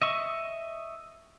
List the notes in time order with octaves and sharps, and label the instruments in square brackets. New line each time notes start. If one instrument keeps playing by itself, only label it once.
[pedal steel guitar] D#5 E5 C#6